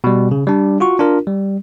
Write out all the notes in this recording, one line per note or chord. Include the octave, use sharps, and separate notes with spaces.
B2 G3
C#3
G3 D4
F4 F#4 C#6
D4 F4 A#4
G3